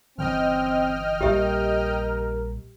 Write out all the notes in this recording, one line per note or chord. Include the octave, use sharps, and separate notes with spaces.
G1 C#3 E3 C4 D#5 G5 F6
A#1 A#2 G3 G4 A#4 E5